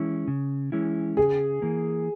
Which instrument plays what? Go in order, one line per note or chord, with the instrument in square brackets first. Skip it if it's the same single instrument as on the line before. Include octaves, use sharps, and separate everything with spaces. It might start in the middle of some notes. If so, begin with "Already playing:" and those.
Already playing: [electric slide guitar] E3 G#3 C#4 E4
C#3
E3 G#3 C#4 E4
[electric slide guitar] C#3 [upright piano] G#4
[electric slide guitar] E3 A#3